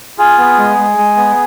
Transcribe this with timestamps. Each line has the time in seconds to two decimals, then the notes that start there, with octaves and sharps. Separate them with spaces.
0.18 F4 G#4
0.38 B3
0.58 G#3
0.78 G#3
0.98 G#3
1.17 B3